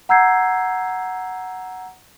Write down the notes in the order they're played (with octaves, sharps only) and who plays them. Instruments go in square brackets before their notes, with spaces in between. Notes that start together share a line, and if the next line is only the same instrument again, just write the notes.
[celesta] F#5 A#5 E6 G6 G#6 C7